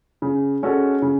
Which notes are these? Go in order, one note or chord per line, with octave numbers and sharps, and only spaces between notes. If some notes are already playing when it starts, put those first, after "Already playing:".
C#3
G#3 C#4 F#4 A4
C#3